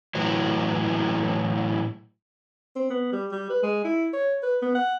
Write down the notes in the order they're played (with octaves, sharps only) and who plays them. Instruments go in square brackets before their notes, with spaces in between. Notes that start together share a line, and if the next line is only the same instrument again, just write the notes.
[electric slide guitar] A2 E3 F#3
[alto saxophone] C4
B3
G3
G3
B4
G#3
E4
C#5
B4
B3
F#5